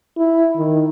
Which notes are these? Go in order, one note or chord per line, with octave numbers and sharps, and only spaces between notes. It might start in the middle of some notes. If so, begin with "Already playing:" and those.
E4
D#3